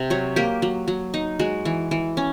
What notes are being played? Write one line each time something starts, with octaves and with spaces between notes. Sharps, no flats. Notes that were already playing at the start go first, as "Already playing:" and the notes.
Already playing: C3
F#3 C#5
A#3 G4
F#3
F#3
D#4
G#3 F#4
E3
E3
C#4